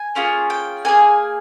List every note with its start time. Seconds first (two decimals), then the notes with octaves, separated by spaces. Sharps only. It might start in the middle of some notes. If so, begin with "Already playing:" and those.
Already playing: G#5
0.15 A#3 C#4 F4 G#4
0.50 G5
0.85 A#3 D#4 G#4 G#5